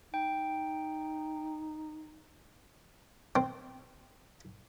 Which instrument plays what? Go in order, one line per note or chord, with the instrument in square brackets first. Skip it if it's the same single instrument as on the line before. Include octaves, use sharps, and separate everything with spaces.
[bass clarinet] D#4 [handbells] G5
[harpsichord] C4